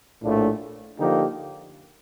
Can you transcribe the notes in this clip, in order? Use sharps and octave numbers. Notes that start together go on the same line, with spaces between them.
A#1 A2 F3 A3 D4
D3 F3 A#3 D#4 G4